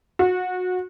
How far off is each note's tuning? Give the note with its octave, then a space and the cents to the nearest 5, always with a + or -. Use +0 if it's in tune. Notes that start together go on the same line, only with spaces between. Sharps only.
F#4 -25